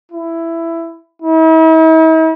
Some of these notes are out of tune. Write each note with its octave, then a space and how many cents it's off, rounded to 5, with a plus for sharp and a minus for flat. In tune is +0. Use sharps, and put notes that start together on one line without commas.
E4 +10
E4 -45